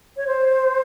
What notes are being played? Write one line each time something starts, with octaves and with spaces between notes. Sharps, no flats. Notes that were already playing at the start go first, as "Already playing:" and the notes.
C#5
C5